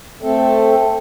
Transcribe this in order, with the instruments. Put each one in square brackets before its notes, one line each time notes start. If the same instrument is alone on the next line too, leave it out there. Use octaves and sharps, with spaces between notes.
[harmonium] A3 C4 A4